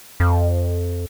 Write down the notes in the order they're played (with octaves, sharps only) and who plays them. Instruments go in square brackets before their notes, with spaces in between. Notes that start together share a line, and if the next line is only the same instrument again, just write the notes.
[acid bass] F2